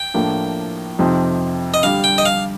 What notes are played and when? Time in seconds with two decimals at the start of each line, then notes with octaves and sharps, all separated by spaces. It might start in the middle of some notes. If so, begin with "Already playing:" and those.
Already playing: G5
0.14 A2 F3 A#3 D4
0.99 F2 C3 F3 C4 D#4
1.74 D#5
1.83 D3 G3 D4 F5
2.04 G5
2.18 D#5
2.26 F5